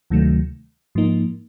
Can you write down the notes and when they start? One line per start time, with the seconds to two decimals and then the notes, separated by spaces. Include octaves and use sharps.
0.10 D2 C3 D#3 F#3 A3
0.95 G#2 F3 A#3 D#4